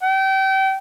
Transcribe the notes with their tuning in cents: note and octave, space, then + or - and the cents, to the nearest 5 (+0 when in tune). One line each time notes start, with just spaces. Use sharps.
G5 -30